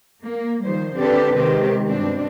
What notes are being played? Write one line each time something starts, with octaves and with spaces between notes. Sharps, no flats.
A#3
D#3 F3 G3 C5
D3 C4 D4 G4 A4 B4
C3 D#3 G#3 C4 G4
G2 B2 C4 D4